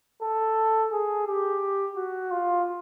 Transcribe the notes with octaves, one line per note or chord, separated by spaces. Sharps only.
A4
G#4
G4
F#4
F4